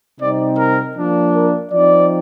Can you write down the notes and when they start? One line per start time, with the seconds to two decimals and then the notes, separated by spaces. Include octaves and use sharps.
0.20 C3 G3 C4 D#4 D5
0.58 A#4
0.96 F3 A#3 D4
1.33 A#4
1.72 F3 C4 D#4 D5